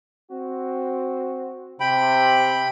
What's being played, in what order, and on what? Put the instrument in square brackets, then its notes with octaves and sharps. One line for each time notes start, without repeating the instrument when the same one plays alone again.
[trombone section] C4 F#4
[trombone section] C3 [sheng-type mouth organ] G5 B5